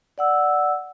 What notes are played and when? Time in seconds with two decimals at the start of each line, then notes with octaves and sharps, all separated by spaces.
0.18 D5 F#5 E6